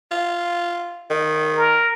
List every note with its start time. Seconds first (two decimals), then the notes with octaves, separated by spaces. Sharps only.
0.11 F4
1.10 D#3
1.57 A#4